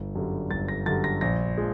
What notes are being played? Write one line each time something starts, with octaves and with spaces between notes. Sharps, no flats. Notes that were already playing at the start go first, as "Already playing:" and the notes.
Already playing: G1
F#2 D3 G3
G1 A6
A#6
F#2 D3 G3 A6
A#6
A#1 A#6
F3 G#3